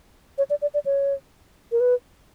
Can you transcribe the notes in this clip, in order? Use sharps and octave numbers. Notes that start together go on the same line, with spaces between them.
C#5
D5
D5
D5
C#5
A#4
B4